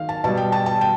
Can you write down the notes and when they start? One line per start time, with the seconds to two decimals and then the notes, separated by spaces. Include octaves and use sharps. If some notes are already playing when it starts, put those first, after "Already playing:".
Already playing: D#3 F5
0.09 A5
0.24 B2 G3 A5
0.37 G5
0.52 A5
0.66 A5
0.81 G5